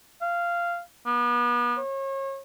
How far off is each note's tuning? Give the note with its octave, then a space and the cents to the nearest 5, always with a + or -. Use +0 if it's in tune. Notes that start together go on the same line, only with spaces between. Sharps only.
F5 -10
B3 -35
C#5 -35